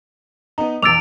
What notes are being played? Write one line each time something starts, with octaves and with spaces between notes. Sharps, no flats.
B3 D#4 A#5
B1 E2 D6 E6 A6 D7 F7